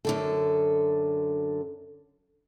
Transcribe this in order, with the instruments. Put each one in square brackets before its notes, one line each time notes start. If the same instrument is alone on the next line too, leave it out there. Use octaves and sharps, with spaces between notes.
[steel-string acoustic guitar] F#2 D3 A4